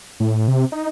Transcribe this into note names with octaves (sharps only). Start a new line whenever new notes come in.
A2
C3
D#4